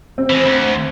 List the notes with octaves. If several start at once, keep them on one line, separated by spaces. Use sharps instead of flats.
C4
E3 G#3
D2